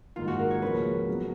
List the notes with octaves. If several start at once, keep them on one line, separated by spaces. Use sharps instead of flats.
G#2 D#3 A#3 F4
F#4
A#4
C#5
C#2 C#3 F3 A#3 C#4 B4
C#3 F#3 B3